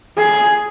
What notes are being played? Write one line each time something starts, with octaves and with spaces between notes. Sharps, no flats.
G#4